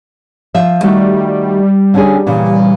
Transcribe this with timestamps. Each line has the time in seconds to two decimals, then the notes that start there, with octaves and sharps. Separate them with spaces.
0.54 F3 E5
0.83 D#3 G3 A3 F#4
1.94 D3 C#4 G#4
2.27 A#2 C#3 E3